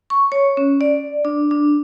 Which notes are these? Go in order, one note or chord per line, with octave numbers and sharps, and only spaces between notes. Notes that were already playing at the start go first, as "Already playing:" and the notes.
C#6
C#5
C#4
D5
D4
D4